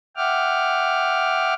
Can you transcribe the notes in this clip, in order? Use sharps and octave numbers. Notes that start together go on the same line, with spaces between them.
E5 F#5 G5 D6 F6